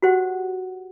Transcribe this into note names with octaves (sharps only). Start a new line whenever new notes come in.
F#4 G4 C5 F#5